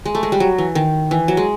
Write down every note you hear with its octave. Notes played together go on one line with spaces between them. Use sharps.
G#3
A3
G#3
G3
F#3
E3
D#3
E3
F#3
G#3